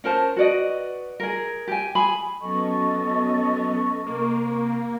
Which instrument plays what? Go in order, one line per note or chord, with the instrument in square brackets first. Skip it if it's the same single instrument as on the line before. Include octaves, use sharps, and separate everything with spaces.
[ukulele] C#4 A#4 C5 A5
F#4 B4 D5 D#5
G#4 A#4
G4 G#5
G#4 G#5 B5
[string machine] F#3 B3 C#4 [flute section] A4 D#5 [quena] C#6
[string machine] C3 [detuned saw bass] A#3